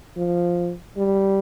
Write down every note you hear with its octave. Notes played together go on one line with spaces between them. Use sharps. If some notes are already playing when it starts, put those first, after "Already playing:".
F3
G3